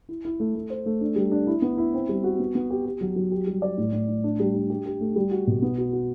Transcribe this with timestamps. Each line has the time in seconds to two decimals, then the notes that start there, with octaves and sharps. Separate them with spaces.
0.09 E4
0.25 E4
0.40 A3
0.55 A3
0.70 C5
0.86 A3
1.01 D4
1.16 G3
1.32 D4
1.47 E4
1.62 B3
1.78 E4
1.94 C4
2.09 G3
2.24 F#4
2.39 B3
2.55 B3
2.70 G4
2.85 G4
3.01 F#3
3.16 F#3
3.32 G4
3.47 G3
3.62 D5
3.78 A2
3.93 A2
4.09 A2
4.24 D4
4.40 G3
4.55 D4
4.70 G4
4.85 G4
5.01 A3
5.16 G3
5.31 F#4
5.47 B2
5.62 B3
5.78 F#4
5.93 F#4